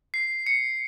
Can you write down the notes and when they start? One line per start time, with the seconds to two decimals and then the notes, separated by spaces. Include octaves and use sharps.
0.14 C7
0.46 C#7